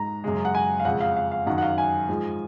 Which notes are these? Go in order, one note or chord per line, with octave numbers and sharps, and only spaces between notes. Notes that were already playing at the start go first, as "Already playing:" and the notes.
Already playing: G#2 A#5
F#2 C#3 G#3
F#5
G#5
F5
F2 C#3 G#3 F#5
F5
F5
F5
F#2 D#3 F#3 F#5
F#5
F5
G#5
G#2 F3 G#3